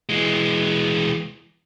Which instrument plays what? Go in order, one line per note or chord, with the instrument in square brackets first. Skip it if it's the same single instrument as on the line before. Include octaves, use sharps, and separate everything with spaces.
[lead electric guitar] E3 G#3